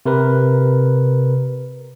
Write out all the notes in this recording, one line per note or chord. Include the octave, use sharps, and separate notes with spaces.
C3 A#4 B4